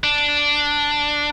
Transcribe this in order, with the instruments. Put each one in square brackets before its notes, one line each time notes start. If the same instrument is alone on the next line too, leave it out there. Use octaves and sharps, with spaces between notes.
[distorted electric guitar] D4